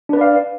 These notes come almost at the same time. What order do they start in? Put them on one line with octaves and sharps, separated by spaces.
D4 B4 D5 F5